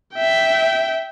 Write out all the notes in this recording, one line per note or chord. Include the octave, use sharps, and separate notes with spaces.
E5 G5